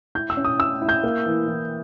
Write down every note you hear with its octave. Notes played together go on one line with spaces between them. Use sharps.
E4 G6
E6
C#4
D#6
E4 E6
E4
G6
A#3
E3
E3